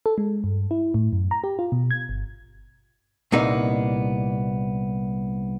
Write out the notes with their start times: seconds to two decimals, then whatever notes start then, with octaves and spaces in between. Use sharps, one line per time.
0.06 A4
0.18 G#3
0.44 G2
0.71 E4
0.94 A2
1.13 F#2
1.31 A#5
1.44 G4
1.59 F4
1.72 B2
1.91 G#6
2.09 G1
3.32 C2 A#2 A#3 B3 D#4 E5